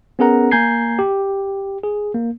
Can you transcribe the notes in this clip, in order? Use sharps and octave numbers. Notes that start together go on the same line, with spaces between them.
B3 C#4 G#4 A#4 F#5 A#5
A#3 G#5 A#5 G6 G#6 C7
G4
G#4
A#3